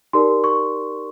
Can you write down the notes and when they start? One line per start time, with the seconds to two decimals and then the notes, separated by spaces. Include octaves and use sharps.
0.13 D#4 G4 A#4 D5 C6
0.44 C#6